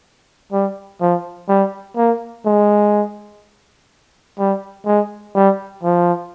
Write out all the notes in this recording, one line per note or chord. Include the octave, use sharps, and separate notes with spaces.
G3
F3
G3
A#3
G#3
G3
G#3
G3
F3